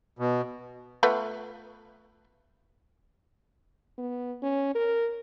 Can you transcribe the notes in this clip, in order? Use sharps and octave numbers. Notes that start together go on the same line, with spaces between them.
B2
A3 B3 F4
B3
C#4
A#4